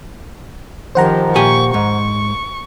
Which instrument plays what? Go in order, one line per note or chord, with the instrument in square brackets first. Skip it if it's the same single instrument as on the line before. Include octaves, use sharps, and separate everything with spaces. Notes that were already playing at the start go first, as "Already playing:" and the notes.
[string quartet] D#3 F3 G4 [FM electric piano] C5 F#5 A#5
[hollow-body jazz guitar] A#2 G4 G#5 [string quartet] C#6
[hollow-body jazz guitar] G#2 [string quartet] C#6